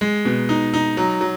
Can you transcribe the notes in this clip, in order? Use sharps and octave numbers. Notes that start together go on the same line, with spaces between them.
G#3
B2
D#4
D#4
F#3
F#3